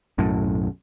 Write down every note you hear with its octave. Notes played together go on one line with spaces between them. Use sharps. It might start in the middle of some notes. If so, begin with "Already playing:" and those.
B1 F#2 A2